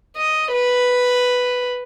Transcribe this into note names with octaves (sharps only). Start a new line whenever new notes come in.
D#5
B4